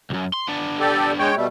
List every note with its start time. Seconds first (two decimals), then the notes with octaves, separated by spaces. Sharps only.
0.10 B1 F#2
0.33 C6
0.48 B3 D4
0.80 G4 A4 D5
1.19 G#3 C#5 G5
1.35 B2 G3 A3